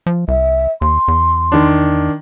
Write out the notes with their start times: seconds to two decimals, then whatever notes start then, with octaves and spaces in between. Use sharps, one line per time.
0.06 F3
0.28 C2 E5
0.81 D#2 C6
1.08 E2
1.52 D#3 D4